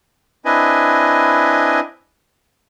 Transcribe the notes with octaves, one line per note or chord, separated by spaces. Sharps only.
C4 D4 E4 B4 D#5 G#5